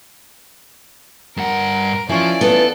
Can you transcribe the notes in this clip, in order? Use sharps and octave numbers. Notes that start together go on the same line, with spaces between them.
G2 A#4 F#5
E3 F3 C#4 F4 D5
B3 D4 A4